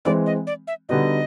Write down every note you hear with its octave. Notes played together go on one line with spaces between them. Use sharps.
E3 G#3 C4 D5
D#5
D5
E5
D3 G3 B3 D#4 F#4 D#5